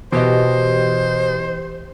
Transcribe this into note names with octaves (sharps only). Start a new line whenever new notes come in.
B2 E3 G4 C5 D#5